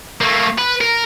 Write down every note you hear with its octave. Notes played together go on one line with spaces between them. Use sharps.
A3 A#3
B4
A#4